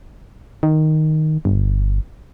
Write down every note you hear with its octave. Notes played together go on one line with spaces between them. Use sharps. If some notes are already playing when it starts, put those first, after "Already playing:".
D#3
G1